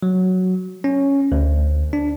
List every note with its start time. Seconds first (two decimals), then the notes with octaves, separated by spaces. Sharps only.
0.03 F#3
0.84 C#4
1.32 D2
1.93 D4